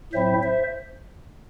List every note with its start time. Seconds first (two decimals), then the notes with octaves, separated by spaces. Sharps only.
0.13 A2 F#3 C4 E4 C5 E5
0.42 C5 E5